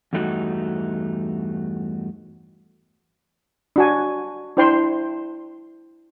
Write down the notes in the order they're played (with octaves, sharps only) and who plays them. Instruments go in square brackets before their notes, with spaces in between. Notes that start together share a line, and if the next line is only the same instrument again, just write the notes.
[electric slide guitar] E2 G2 A3 D#4 F#4
[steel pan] D4 F#4 G#5
D4 E4 C5 G5 C6